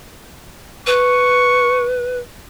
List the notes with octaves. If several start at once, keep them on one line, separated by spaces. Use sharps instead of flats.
B4 C#6